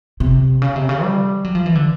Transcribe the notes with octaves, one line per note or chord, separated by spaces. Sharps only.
C3
C#3
C3
C#3
G3
F#3
F3
E3
D3